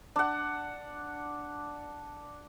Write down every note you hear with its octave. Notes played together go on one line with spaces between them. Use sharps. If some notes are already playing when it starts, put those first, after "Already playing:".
D4 F#5